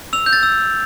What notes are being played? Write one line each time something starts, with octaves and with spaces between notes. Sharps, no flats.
E6 F7
G6
A6
E6